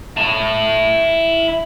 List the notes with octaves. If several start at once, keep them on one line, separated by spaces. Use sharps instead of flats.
E4 A5